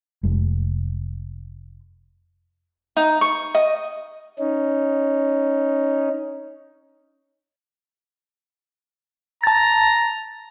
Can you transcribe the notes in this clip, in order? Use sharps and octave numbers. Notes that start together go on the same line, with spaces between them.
F1 G#3
D#4
C#6
D#5
C#4 D#4
A5 A#5 A6